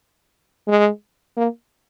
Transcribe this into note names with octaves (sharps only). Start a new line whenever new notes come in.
G#3
A#3